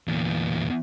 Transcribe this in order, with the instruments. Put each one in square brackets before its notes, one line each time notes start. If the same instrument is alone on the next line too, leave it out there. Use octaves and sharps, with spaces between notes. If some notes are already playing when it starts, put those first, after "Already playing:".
[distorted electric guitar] E2 A#2